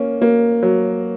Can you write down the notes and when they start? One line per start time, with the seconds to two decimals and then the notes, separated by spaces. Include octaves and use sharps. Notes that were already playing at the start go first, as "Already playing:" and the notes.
Already playing: A#3 C#4
0.22 A#3
0.63 F#3